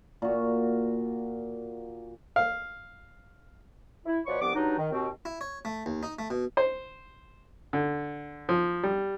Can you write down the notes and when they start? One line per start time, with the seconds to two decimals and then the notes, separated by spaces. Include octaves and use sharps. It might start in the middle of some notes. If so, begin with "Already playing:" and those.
0.22 A#2 F#4
2.36 F5
4.06 E4
4.26 B2 F3 B4 C#5 D5 C#6
4.41 C2 G2 F3 B3 D6
4.55 G2 F#3 D4 D#4
4.78 D#3
4.91 D#2 B2 C4
5.25 E4
5.41 C#5
5.65 A3
5.86 D#2
6.03 D#4
6.19 A3
6.30 B2
6.57 C5
7.73 D3
8.49 F3
8.83 G3